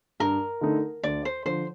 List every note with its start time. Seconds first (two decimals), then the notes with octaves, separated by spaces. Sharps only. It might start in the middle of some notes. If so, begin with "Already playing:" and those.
0.20 G2 A#4
0.61 D3 A3 D#4
1.03 D2 D5
1.25 C5
1.45 D3 F3 C5